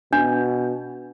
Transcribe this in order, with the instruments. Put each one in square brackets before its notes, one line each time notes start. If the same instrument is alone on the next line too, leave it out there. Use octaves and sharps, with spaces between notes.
[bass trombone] B2 [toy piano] D4